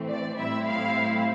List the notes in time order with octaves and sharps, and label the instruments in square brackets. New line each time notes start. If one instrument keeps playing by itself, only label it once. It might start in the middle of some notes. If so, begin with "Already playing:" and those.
Already playing: [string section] A2 E3 A3 C4
D5
A2 G3 C4 E4 E5
F5